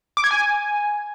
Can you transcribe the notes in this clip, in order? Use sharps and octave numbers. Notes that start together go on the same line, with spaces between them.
D6
G#6
G#5